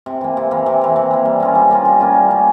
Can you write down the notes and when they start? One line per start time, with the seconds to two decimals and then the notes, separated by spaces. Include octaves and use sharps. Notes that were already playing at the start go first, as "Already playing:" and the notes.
0.06 C3
0.21 E3 A#3
0.37 C3
0.51 E3 A#3
0.66 C3
0.81 E3 A#3
0.96 C3
1.11 E3 A#3
1.25 G3
1.40 A#3 C#4 F4
1.55 G3
1.71 A#3 C#4 F4
1.85 G3
2.00 A#3 C#4 F4
2.15 G3
2.29 A#3 C#4 F4